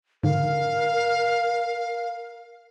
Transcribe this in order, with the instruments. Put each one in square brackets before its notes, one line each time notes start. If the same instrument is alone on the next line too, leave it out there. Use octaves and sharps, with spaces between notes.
[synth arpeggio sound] G#2 D3 [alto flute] A#4 [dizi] F5